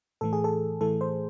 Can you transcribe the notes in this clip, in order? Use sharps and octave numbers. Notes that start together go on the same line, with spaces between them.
A2 E3 A3 A4
G#4
A4
A2 E3 A3 A4
C5